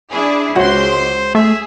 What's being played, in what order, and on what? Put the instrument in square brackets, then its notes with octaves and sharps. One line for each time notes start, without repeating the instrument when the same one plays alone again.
[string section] D4 E4 G#4
[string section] C#2 C6 [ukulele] F#4 C#5 F#5 [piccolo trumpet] C5
[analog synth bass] A3 [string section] G#4 [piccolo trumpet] E5